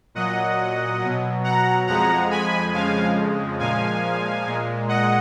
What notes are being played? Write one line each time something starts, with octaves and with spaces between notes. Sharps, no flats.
A#2 F#3 D#5 F#5
B2 F#3
F#5 A#5
F2 F3 G#3 F#5 A#5
G#5 B5
F2 C#3 F3 G#3 F5 G#5
A#2 F3 G#3 F5 G#5
A#2 G#3
D#5 F#5